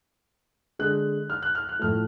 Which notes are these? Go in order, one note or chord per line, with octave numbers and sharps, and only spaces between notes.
D3 G#3 F#6
F6
F#6
F6
F#6
A2 F3 A3 F6